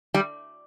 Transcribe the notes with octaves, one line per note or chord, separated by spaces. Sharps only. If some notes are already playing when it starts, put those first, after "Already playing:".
G3